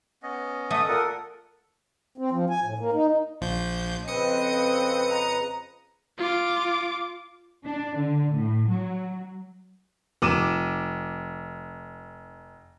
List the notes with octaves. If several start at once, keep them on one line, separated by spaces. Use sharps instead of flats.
B3 C#4 D#5
A3 E5 F#5 D#6
A#2 A4 A#4 F#5
C4
F3
G#5
A2
A#3
D#4
A#1 F3 G6
F2 C#3 C4 B4 D#5 D#6 C#7
A#5
F4 D6
D4
D3
A2
F#3
F1 D6 D#7 E7